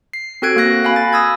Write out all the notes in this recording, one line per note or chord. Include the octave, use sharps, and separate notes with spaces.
C7
C4 F#4 A4 F#6 G#6 D7
A#3 F#4 F#6 A#6
F5 G#5 B5
A6
D#6 E6 G#6